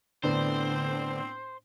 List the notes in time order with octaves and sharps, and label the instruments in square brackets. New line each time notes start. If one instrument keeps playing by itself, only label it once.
[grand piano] A2 B3 D4 [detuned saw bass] D3 [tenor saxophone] C4 [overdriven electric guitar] C5